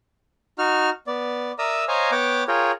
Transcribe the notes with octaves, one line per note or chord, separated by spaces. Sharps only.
D#4 F#4 F6
B3 D5
A#4 D5 E5 A#5 D#6 E6
C5 C#5 D#5 F5 G#5 A#5
B3 C#5 F#5 G5 D6
F4 G#4 A#4 C#5 G5